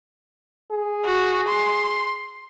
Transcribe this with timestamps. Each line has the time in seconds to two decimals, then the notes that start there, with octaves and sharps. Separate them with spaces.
0.72 G#4
1.05 F#4
1.48 C6